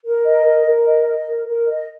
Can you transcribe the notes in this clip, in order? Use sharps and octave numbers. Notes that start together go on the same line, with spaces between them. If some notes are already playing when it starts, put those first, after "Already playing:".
A#4
D#5
A#4
A#4
D#5
D#5
A#4
A#4
D#5